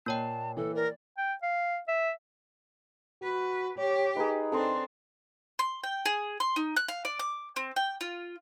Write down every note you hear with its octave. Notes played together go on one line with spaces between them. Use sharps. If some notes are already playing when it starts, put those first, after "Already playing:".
A#2 A#3 C#5 G5 A5
E3 A4
A#4 D5
G5
F5
E5
F#4 B4
G4 C#5
D#4 G#4 A#4 B4
C4 D4 A4 D#5 C6
C6
G5
G#4
C6
D#4
F#6
F5
D5
D6
C4
G5
F4